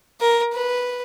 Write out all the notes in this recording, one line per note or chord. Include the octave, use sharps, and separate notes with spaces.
A#4
B4